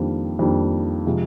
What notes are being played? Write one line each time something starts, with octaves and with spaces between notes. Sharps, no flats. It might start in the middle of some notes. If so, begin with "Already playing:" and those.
Already playing: F2 D#3 G3 A#3 D4
F2 D#3 G3 A#3 D4
C3 F3 G#3